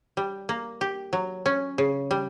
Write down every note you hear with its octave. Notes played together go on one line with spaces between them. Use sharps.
G3
A#3
G4
F#3
C#4
C#3
G3